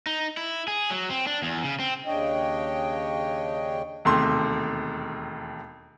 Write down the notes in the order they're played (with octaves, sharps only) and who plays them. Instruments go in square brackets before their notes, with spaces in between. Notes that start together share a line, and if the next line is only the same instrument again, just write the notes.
[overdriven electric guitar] D#4
E4
G#4
F#3
C4
D4
E2
C#3
C4
[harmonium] D#2 C#3 D4 C#5 D#5 G5
[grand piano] E1 D#2 C3 A3 C6